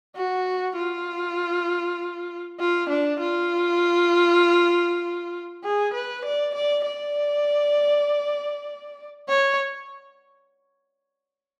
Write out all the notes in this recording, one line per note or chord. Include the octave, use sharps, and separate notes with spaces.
F#4
F4
F4
D4
F4
G#4
B4
D5
D5
D5
C#5